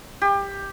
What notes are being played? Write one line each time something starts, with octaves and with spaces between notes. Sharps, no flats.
G4